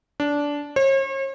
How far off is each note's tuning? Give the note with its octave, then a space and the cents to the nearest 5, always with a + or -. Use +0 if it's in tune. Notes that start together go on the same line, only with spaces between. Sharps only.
D4 -15
C#5 -45